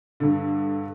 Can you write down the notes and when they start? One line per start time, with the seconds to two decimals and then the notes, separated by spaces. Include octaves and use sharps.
0.20 G2 D3